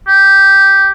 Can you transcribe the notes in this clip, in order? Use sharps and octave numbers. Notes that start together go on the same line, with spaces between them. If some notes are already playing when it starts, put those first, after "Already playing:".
G4